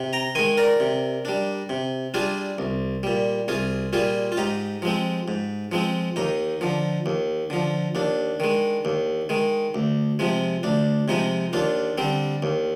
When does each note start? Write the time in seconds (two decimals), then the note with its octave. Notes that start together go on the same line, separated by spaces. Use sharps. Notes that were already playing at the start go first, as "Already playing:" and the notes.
Already playing: C3
0.13 G5 A#5
0.35 D#3 G#3 G#5 C6
0.57 A#4 D5
0.80 C3
1.25 G3 D4
1.69 C3
2.14 G3 D4 F4 G#4
2.58 C2
3.03 A#2 G3
3.48 C2 F4 G#4
3.93 A#2 G3 F4 G#4
4.32 F4
4.37 G#2 D#4 G4
4.82 F3 G#3 C4
5.28 G#2
5.72 F3 G#3 C4
6.16 D#2 D#4
6.61 D3 F3
7.06 D#2
7.50 D3 F3
7.95 D#2 D4
8.40 D#3 G#3
8.85 D#2
9.29 D#3 G#3
9.75 D2
10.19 C3 F3 G#3
10.63 D2 D4
11.08 C3 F3 G#3 D#4
11.53 D#2 D4 F4
11.98 D3 G3 C4
12.43 D#2